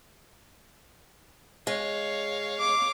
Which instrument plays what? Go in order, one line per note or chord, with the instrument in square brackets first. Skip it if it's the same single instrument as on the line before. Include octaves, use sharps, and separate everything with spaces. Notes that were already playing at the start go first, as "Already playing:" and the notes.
[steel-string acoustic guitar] G#3 [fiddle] C#5 F5
[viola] D6